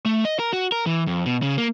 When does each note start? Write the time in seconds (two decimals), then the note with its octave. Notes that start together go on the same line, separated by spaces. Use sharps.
0.05 A3
0.25 D#5
0.39 A#4
0.53 F#4
0.72 A#4
0.86 E3
1.07 F2
1.26 B2
1.42 C#3
1.58 A#3